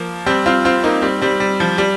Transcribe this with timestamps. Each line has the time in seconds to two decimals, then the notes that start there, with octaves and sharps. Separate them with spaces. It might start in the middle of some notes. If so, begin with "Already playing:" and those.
Already playing: F3 A#3
0.26 G3 C4
0.46 C4 F4
0.65 C4 F4
0.84 A#3 D#4
1.02 G3 C4
1.22 G3 C4
1.40 G3
1.60 F3
1.78 G3